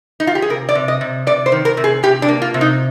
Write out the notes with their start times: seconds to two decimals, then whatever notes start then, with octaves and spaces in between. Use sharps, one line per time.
0.20 D#4
0.27 F4
0.35 G4
0.42 G#4
0.50 C3 A#4
0.69 D5
0.75 C3
0.88 D#5
1.01 C3
1.27 C3 D5
1.46 C5
1.52 D#3
1.65 A#4
1.77 C3
1.84 G#4
2.03 C3 G4
2.22 D4
2.28 A#3
2.42 F4
2.54 C3
2.61 D#4